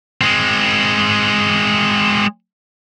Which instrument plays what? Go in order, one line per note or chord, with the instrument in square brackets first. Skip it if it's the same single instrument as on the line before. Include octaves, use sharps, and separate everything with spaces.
[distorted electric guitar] G#3 C4